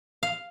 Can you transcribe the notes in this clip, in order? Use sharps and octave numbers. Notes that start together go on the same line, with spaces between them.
F5